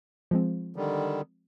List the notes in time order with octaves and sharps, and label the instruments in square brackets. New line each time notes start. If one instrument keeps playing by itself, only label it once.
[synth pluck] F3 G#3 C4
[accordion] D3 D#3 G3